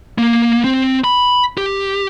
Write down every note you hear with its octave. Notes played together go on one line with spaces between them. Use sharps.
A#3
C4
B5
G4